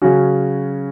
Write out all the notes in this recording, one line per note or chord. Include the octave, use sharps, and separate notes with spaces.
C#3 F#3 C#4 F#4